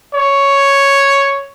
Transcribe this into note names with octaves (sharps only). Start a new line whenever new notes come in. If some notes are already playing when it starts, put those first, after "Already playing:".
C#5